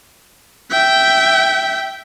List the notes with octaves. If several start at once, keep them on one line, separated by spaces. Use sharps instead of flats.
E5 G5